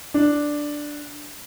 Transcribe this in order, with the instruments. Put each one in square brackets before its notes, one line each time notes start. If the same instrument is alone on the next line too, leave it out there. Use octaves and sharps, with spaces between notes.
[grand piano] D4